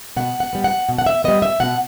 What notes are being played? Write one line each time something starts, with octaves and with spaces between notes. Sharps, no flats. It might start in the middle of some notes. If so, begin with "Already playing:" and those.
B2 F#5
F#5
G3 B3
F#5
B2
F#5
E5
G3 B3 D#5
E5
B2 F#5